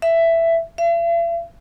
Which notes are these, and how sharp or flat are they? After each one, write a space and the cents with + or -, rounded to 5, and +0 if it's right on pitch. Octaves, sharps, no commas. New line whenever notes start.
E5 +10
E5 +45